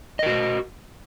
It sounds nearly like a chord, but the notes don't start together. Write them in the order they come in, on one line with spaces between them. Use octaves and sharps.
D#5 A#4 F#4